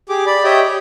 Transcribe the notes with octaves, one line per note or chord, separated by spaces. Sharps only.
G4 G#4 D6
D5 B5
G4 C#5 D#5 E5 G5
G4